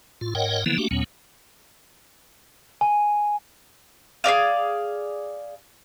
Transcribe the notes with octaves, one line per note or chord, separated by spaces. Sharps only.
A2 F4
G#2 A#4 C#5 D#5 F#5 G5
D3 E3 F3 A#3 B3 E4
A3 A#3 D4 F#4 G4
D#2 A#2 F#3 B3 C#4
G#5
G#4 A#4 D5 F5